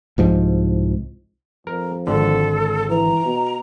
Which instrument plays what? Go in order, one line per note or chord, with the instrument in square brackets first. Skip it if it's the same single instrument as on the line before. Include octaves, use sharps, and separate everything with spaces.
[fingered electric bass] C2 G#2 F3
[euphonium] F2 [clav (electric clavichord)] A#4
[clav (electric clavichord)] G#1 D3 [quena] A4
[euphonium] E3 [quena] A#5
[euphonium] B2